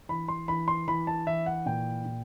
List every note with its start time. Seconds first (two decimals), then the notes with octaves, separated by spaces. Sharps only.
0.09 E3 B5
0.28 C6
0.48 E3 B5
0.68 C6
0.88 E3 B5
1.07 A5
1.27 E3 E5
1.46 F#5
1.66 A#2 G5
2.05 A#2